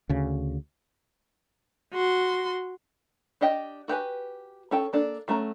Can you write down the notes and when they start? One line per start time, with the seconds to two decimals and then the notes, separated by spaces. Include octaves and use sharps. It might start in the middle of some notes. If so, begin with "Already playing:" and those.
0.09 D2 C#3
1.94 F#4 C6
3.41 D4 G4 D#5 G5
3.88 F#4 G4 B4 G#5
4.71 C#4 A4 G5
4.93 A#3 D4 A4
5.28 F#3 A3 C#4 A#5